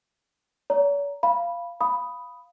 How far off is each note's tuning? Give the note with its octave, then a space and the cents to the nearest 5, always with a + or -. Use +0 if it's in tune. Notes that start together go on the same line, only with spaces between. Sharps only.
C#5 +45 A#5 +0
F5 -15 B5 -10
F5 +0 B5 +0 D#6 +0